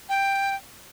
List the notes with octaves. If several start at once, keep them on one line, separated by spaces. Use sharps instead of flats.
G5